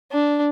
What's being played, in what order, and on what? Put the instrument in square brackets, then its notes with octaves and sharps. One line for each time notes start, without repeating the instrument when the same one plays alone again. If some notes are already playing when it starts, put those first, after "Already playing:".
[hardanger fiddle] D4